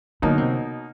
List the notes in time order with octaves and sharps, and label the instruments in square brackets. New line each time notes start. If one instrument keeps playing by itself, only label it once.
[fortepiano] B2 F#3 A#3 D#4 [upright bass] D3
[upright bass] C3